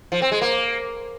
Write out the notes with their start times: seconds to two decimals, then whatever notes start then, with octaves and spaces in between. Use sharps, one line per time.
0.12 F3
0.22 C4
0.32 G#3
0.42 A#3